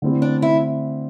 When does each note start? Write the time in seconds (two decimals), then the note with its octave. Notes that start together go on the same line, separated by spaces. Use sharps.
0.02 D3 A3 C4 E4 G4
0.22 D4
0.42 E4